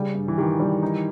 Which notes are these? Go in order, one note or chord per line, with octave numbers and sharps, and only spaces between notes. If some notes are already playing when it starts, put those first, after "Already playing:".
Already playing: C#3 G3
G2
E3
D#3 G4
G3
D#4